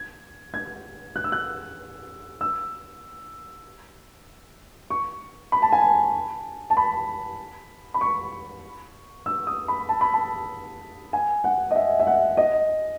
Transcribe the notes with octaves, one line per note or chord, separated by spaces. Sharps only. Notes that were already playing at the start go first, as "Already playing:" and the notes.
Already playing: G#6
G#6
F#6
E6
F#6
E6
C#6
B5
A5
G#5
A5
A5
B5
B5
C#6
E6
D#6
B5
A5
B5
A5
G#5
F#5
D#5
E5
E5
F#5
D#5